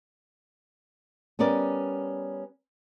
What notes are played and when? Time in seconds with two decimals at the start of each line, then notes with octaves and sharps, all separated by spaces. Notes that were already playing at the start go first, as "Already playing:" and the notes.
1.39 G3 B3 C#4 A#4 D5